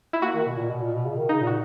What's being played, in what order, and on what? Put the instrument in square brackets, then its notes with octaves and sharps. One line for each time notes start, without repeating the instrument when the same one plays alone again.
[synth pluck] E4
[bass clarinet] A#3 [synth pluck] F#4
[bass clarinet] D#3
B2
A#2
B2
A#2
B2
C#3
D#3
[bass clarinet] C#3 [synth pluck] D#4
[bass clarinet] A#2
[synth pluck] F#4